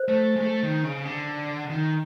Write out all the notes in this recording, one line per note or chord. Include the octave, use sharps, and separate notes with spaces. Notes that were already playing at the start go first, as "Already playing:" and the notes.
Already playing: C5
A3
G#3
A3
D#3
C#3
D3
D#3